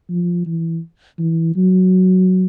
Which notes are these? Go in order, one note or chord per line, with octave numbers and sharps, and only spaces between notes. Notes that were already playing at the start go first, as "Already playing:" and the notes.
F3
E3
E3
F#3